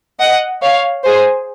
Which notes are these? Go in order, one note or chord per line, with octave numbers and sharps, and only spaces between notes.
D#5 F#5
C#5 F5
G#4 C5